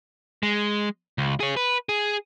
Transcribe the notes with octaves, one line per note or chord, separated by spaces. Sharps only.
G#3
C#2
G#4 C#5
B4
G#4